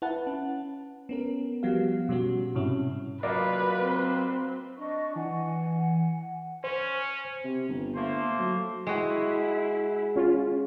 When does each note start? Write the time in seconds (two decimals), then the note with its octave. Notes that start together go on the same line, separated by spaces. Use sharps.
0.02 E4 B4 F#5 A5
0.27 C#4
1.09 B3 C#4 A#4
1.63 F3 G3 B3 F#4 F5
2.09 B2 G3 C#4 F#4
2.55 G#2 C3 C#4 E4
3.23 F#3 A#3 F4 A#4 B4 D5 D#5
3.80 C4
4.77 D4 D#5 C#6
5.16 E3 F#5 G#5
6.64 C#4 C5
7.44 C3
7.69 G1
7.95 A3 A#3 C5
8.39 F#3
8.87 G#3 E4 F#4
10.16 C#4 F4